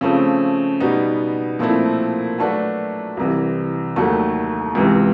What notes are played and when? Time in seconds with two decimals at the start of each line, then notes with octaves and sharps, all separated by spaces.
0.01 C#3 F3 A3 C4
0.80 B2 G3 B3 D#4
1.59 A#2 F3 A3 C4 E4
2.38 F#3 A3 D4 F#4 B4
3.17 C2 C3 E3
3.96 D#2 D3 F#3 A3
4.75 C#2 C3 E3